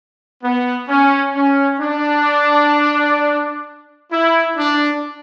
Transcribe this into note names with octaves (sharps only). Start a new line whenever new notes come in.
B3
C#4
C#4
D4
E4
D4